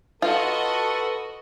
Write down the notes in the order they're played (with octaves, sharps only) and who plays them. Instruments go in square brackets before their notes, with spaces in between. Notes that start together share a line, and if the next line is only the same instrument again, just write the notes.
[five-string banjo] F4 [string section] F#4 D#5 [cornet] A4 [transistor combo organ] B4